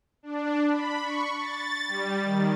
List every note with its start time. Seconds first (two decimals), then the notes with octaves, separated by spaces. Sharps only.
0.23 D4
0.69 B5
1.01 C#6
1.37 A6
1.88 G3
2.24 D#3